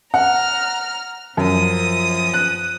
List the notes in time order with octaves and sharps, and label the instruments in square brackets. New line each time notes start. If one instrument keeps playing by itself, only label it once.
[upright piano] F#5 [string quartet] A#5 F6
[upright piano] F#2 [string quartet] F3 D#6
[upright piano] F#6